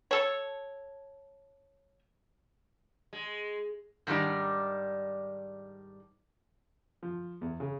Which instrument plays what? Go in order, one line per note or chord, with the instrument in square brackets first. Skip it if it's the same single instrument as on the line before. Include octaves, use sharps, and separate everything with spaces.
[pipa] A4 C#5
[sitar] G#3
[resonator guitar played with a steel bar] G#2 D#3 G3 D4 D#4
[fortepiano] F3
E2
C#3